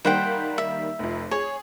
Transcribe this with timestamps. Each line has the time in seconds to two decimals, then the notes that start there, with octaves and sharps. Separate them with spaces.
0.05 D#3 G3 A#3 C5 F#5 G5
0.58 E5
0.99 F1 F2
1.31 G#4 C#5